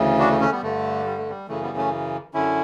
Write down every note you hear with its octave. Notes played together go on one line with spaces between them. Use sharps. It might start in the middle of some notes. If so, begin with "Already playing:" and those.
Already playing: D2 C#3 E3
D4 F#4
A3
A3 C#4
G3 B3
G2 D3 A3
G3
A3
G3
F#2 C#3 E3 A3
G3 B3
A3 C#4
F#2 D3 C#4 E4